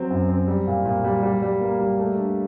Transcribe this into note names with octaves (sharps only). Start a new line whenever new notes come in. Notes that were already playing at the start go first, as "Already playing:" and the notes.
Already playing: F#3 C4
F#2
C4
G3
A#2
A#2
G3
G3
G3
A#3
G3
A3
D4